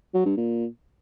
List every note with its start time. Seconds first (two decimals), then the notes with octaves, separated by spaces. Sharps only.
0.14 F#3
0.26 G2
0.37 A#2